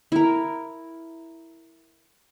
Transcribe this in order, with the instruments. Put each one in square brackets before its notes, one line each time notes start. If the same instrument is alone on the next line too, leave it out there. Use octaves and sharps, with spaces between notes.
[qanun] E4 A#4